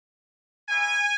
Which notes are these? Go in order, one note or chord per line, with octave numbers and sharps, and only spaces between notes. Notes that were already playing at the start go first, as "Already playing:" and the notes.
A#3 E4 G#5